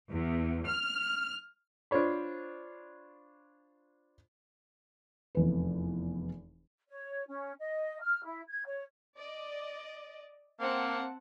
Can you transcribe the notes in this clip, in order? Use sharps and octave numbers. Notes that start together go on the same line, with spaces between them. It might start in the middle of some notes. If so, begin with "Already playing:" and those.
E2
F6
D4 F4 C5 C#5 B5
F1 E2 B4
C#5
C#4
D#5
F6
E4
G#6
C#5
D5 D#5
A#3 C4 F#5 A5